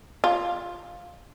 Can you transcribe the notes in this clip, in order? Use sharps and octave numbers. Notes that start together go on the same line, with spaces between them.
F4